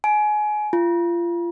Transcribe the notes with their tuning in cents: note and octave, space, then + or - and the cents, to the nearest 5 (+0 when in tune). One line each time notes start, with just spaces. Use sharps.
G#5 +25
F4 -30